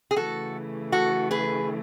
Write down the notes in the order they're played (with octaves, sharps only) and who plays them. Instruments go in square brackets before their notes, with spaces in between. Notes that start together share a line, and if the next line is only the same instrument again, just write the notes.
[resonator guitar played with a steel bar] G#4
[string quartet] C#3 E3 A3 [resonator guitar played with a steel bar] F#4 A4
[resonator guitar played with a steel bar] F#4 A4
G#4 B4